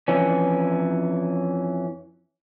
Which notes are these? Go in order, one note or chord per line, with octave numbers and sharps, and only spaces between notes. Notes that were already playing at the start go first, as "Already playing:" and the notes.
F2 E3 C#4